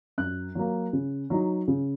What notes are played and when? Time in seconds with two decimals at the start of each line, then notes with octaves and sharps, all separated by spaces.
0.18 F#2 F#6
0.55 F#3 A#3
0.93 C#3
1.30 F#3 D#4
1.68 C#3